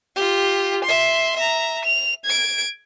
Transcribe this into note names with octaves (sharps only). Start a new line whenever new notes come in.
F4 G4
E5 C6
E5 A#5
F7
G#6 D7